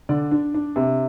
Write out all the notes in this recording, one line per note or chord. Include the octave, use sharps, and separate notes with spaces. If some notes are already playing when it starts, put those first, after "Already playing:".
D3 D5
D4
D4
C3